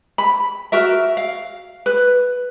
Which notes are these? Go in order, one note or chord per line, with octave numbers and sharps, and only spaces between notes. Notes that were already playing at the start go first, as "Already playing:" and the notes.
B5
F#4 A#4 E5
F5
B4